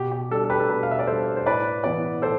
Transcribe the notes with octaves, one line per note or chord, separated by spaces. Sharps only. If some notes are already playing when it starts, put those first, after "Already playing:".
Already playing: B2 G4
G4
G3 D4 A4
A4
G4 B4
A4
B2 G4 B4
F5
E5
D5
G3 D4 A4 C5
C5
A2 B4 D5
E3 B3 E4 B4 D5
A2 A4 C5